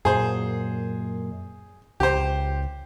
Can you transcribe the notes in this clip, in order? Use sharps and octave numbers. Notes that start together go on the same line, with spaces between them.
F#2 A#2 G#4 C5
C#2 G4 C5